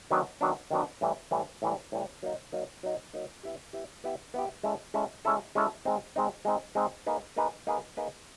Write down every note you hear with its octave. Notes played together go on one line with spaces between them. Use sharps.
D#3 F#3 B3 D4
D#3 F#3 B3 D4
D#3 F#3 B3 D4
A2 E3 G3
A2 E3 G3
A2 E3 G3
A2 E3 G3
F#3 A#3 D#4
F#3 A#3 D#4
F#3 A#3 D#4
F#3 A#3 D#4
B3 E4 G4
B3 E4 G4
B3 E4 G4
B3 E4 G4
G#3 C#4 E4 A4
G#3 C#4 E4 A4
G#3 C#4 E4 A4
G#3 C#4 E4 A4
G#3 C4 D#4
G#3 C4 D#4
G#3 C4 D#4
G#3 C4 D#4
A#3 D#4 G#4 B4
A#3 D#4 G#4 B4
A#3 D#4 G#4 B4
A#3 D#4 G#4 B4